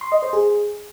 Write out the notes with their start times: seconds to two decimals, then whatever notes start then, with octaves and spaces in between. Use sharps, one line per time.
0.01 C6
0.12 D#5
0.22 C5
0.33 G#4